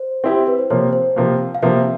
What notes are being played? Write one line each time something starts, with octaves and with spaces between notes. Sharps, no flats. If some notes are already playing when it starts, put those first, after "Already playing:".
Already playing: C5
C4 E4 G4
B4
C5
C3 F3 A#3 C#5
C5
C3 F3 A#3
F5
C3 F3 A#3 E5